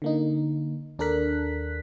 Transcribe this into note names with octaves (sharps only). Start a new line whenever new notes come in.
D3 A#3 D#4
D#2 D4 A4 A#4 F#6 B6